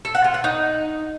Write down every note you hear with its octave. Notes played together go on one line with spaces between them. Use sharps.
A4
F#5
F4
F#5
D#4